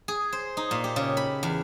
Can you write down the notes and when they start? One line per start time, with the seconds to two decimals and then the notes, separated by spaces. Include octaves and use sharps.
0.08 G#4
0.32 C5
0.57 D#4
0.71 A#2
0.84 G4
0.96 C#3
1.17 B5
1.43 E2